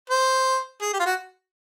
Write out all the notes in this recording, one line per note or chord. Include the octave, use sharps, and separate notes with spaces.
C5
G#4
G4
F4
F#4